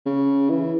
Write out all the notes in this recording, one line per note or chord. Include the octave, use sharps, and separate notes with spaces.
C#3
E3